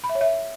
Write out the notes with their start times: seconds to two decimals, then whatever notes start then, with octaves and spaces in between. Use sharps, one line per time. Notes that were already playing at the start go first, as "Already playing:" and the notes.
0.04 B5
0.09 E5
0.15 C#5
0.21 E5